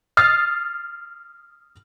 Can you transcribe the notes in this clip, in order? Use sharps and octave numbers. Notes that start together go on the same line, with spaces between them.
D#6 F6 A6 C7